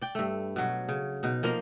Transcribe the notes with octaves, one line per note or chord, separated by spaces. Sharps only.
D5 G5
G2 A3
B2 F#3
C#3
B2 D#4
F3 A#3 A#4 D#5